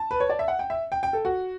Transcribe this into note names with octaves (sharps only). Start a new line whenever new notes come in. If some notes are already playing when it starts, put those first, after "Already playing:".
Already playing: A5
B4
C#5
D5
E5
F#5
G5
E5
G5
G5
A4
F#4